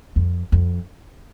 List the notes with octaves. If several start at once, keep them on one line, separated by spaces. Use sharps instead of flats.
F2
F2